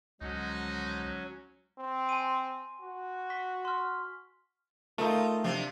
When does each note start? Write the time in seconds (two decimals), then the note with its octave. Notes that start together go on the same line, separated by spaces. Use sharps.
0.21 C#2 D3 F3 F#3 G#3 C#4 D#4
1.78 C4
2.09 G#5 C6 D#7
2.81 F#4
3.30 C#6 B6
3.65 C6 F6
4.98 A3 D#4 F4 A#4
5.44 C3 F3 D4